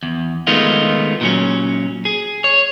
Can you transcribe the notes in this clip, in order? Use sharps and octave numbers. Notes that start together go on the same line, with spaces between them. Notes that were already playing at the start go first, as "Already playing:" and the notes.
E2
D#3 G#3 A3 B3 D#4 F4
A#2 F#3 C#4
G#4
C#5